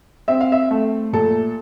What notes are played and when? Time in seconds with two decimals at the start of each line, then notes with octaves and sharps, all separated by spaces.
0.28 C4 E5
0.41 F5
0.52 E5
0.71 A3
1.13 A#2 A4